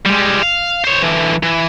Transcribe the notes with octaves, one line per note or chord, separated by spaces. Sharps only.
G3 G#3
F5
C5 C#5
D3 E3
E3